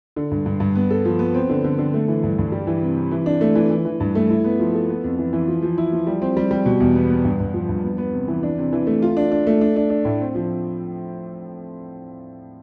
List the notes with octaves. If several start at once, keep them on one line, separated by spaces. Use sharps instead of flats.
D3
G2
G2
G2
B3
A4
F3
B3
C4
D3
D3
D3
A3
E3
G2
G2
G3
E3
C3
C3
E3
D4
A3
E3
E3
E3
G2
A3
E4
B3
F3
A4
B3
F2
E3
E3
F3
F3
E4
F3
G3
C4
G3
G3
B2
E2
B3
B3
G2
G2
F3
G2
B3
B3
C3
E3
D4
C3
E3
A3
F4
D4
D4
A3
D4
D4
D4
A2
C4
F3